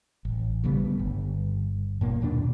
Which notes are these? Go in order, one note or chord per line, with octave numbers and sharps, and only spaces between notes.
A1
D2 C#3 G3 B3
G1
F#2 A#2 A#3
D#2 B2 D4